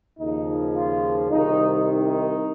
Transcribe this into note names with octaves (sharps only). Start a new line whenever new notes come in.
D#2 C#3 F3 D#4
F4
C2 C3 D#3 D#4
D#4